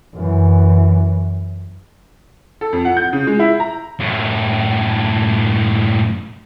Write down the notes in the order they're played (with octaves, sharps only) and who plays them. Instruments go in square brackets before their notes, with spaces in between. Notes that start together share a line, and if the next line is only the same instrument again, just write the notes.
[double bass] F#2 E3
[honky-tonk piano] A4
F2
F#5
G6
C#3
G#3
E4
A#5
[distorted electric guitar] F#2 A2